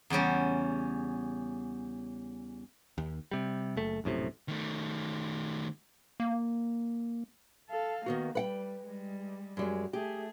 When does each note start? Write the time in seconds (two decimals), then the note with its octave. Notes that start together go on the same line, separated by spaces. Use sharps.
0.10 E2 C#3 G3 C#4
2.98 D#2
3.31 C3 G3
3.77 F#1 A3
4.04 A#1 F#2 A2 C3
4.48 D#3 A3
6.20 A#3
7.70 A4 F5
8.06 D#3 A#3 B3 F#4
8.35 G3 B4 F#5 G5
8.84 G3 G#3
9.57 F#2 G3 G#3
9.93 A3 G4 G#4